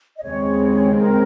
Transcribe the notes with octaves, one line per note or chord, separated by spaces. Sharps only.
D#5
D#2 C#3 G#3 C4 C#5
A#4